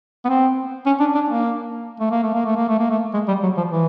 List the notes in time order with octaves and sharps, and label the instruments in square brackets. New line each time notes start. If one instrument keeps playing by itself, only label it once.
[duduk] B3
C4
C#4
D4
D4
A#3
A3
A#3
A3
A#3
A3
A#3
A3
A#3
A3
G#3
G3
F#3
F3
E3